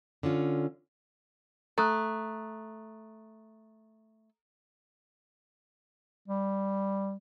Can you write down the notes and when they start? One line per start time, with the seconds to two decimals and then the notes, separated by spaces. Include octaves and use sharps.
0.23 D3 C#4 F4
1.78 A3 A#5 D#6 F#6
6.28 G3